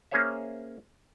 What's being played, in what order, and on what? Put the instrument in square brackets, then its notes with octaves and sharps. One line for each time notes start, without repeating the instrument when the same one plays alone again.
[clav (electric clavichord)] A#3 C#4 G#4 C5 C#5 E5